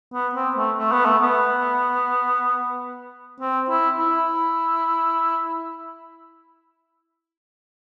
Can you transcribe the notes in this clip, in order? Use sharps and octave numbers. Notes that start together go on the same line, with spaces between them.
B3
C4
A3
A3
B3
A3
B3
C4
E4
E4